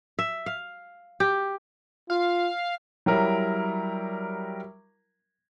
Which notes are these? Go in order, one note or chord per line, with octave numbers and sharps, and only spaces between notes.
E5
F5
G4
F4 F5
F#3 G3 E4 A#4